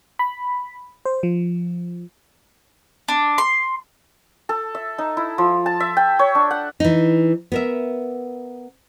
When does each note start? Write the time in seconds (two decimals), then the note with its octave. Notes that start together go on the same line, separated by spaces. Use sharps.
0.19 B5
1.05 C5
1.23 F3
3.08 D4
3.38 C6
4.49 A4
4.75 E5
4.98 D#4
5.17 E4
5.38 F3
5.66 A5
5.80 E5
5.97 G5
6.19 C#5
6.35 D4
6.51 F#5
6.80 E3 D#4
7.52 B3 A#4 E5